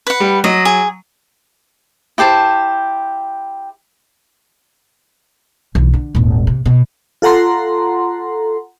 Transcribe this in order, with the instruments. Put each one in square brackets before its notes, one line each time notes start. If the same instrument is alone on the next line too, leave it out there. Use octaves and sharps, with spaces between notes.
[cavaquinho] B4 F#5
[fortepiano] G3
[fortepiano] F#3 [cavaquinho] D#5
[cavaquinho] G#4
E4 G4 C5 A5
[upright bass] B1 E3
D3
D#1 G#1
C3
B2
[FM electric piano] F4 A4 F#5 A#5 C6